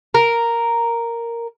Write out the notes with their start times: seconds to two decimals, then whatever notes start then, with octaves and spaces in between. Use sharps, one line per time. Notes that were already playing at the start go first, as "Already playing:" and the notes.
0.14 A#4